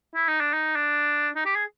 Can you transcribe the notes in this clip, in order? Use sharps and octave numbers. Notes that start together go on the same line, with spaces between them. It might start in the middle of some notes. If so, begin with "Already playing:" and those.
E4
D#4
D4
D#4
D4
D#4
G4
G#4